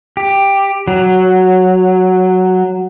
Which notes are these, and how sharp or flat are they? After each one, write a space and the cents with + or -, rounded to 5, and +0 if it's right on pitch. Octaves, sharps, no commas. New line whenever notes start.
G4 +5
F#3 +0